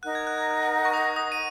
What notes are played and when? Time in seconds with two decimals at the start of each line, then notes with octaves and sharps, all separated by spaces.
0.03 D#4 A#4 F#5 F#6
0.15 G#6
0.27 F#6
0.38 G#6
0.51 F#6
0.85 C#6
0.94 D#6
1.16 D#6
1.32 D#7